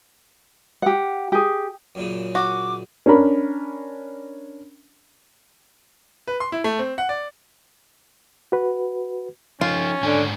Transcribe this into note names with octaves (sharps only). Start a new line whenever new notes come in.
G4 F#5
G4 G#4
F#2 A#2 C#3
F#4 D6
C#4 D4 A#4 B5
B4
C6
E4
A3
C4
F#5
D5
F#4 B4
F3 C#4 D#4 F4
G#2 D3 D4 G#5